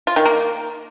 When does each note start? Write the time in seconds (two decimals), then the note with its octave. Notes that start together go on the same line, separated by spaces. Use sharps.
0.07 F4
0.16 D#3
0.25 A#3